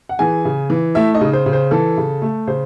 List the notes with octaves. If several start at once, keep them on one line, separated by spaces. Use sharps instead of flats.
F#5
E3 G#4 G#5
C#3
E3
A3 E4 E5
D#4 D#5
C#3
C5
C#3
C5
E3 A4
C#3
A3
C#3 C5